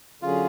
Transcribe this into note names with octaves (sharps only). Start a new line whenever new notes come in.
D3 F#3 C#4 F4 G#4